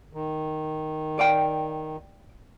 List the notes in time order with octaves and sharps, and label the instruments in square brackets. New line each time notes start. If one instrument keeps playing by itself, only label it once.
[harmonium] D#3
[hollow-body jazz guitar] D5 F5 G5